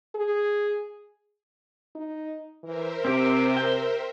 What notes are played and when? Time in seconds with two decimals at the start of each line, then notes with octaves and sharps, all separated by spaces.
0.15 G#4
1.95 D#4
2.64 E3 A#4 C5 E5
3.05 C3 C4 G4
3.57 G5